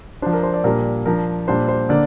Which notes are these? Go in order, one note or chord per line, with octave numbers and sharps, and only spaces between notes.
F3 D4 C5
A#4
C5
D5
A#2 G3 D4 A#4
F3 D4 A#4
A#2 G3 D4 C5
C5
D3 A#3 D4 D5